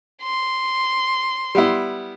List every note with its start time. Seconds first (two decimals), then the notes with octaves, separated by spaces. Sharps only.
0.23 C6
1.55 G3 B3 E4